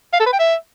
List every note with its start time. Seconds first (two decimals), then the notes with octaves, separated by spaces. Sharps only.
0.13 F5
0.20 A4
0.26 B4
0.33 G5
0.39 E5